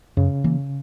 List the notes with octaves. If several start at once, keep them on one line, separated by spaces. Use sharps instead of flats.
F#2 C#3
E3 A#3